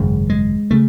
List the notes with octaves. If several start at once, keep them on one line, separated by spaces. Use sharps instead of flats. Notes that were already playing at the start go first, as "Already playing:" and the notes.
Already playing: G#1 F#2 C#3 G#3
G#3
C#3 A3